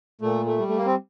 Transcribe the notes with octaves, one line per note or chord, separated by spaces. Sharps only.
A#2 A3
A3
G3
A3
A#3
C4